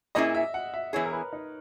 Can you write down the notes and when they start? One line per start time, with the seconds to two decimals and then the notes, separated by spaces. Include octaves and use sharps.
0.15 A#2 A#3 C#4 E4 G#4 D#5
0.35 E5
0.54 F#5
0.74 E5
0.93 E3 B3 E4 G#4 C#5
1.05 A#4
1.13 B4
1.33 D#4